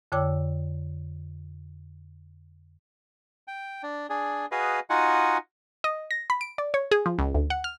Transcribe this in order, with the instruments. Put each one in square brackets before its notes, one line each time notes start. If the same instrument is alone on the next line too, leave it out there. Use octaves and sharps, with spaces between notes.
[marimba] F2 D3 C#5 G5 D6 E6
[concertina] G5
D4
D4 G#4
F#4 G#4 B4 D#5 F5
D#4 F4 F#4 D#5 F#5 G#5
[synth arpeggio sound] D#5
A#6
B5
D7
D5
C#5
G#4
F3
C#2
D2
F#5
F6